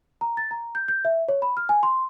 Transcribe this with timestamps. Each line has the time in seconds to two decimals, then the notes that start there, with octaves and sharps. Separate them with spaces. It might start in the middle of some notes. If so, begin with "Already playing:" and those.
0.21 A#5
0.37 A6
0.51 A#5
0.75 G6
0.88 G6
1.05 E5
1.28 C#5
1.42 B5
1.57 F6
1.69 G#5
1.83 C6